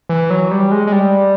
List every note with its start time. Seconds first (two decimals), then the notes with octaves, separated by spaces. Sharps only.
0.09 E3
0.30 F#3
0.51 G3
0.72 G#3
0.87 G#3
0.92 G3